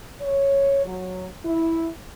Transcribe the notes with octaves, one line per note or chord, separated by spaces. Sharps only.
C#5
F#3
E4